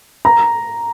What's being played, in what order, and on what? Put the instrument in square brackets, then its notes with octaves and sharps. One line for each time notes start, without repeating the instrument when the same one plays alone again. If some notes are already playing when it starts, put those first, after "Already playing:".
[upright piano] A#5